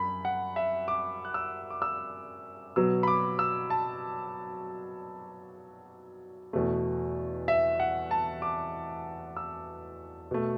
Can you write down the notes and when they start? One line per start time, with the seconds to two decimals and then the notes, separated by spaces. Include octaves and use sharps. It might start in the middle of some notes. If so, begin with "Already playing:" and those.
Already playing: F#2 B5
0.25 F#5
0.56 E5
0.88 D6
1.25 F#6
1.34 E6
1.70 D6
1.82 E6
2.76 B2 F#3 B3 E6
3.03 B5
3.07 D6
3.39 E6
3.70 A5
6.53 E2 B2 A3
7.48 E5
7.80 F#5
8.11 A5
8.42 D6
9.37 E6
10.31 B2 A3